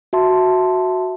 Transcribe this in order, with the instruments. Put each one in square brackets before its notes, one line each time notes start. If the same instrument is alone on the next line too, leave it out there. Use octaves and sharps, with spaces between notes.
[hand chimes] F#4 E5 A5 C6